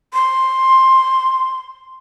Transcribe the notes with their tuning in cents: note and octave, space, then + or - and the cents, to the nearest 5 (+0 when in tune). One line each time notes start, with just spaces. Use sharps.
C6 +5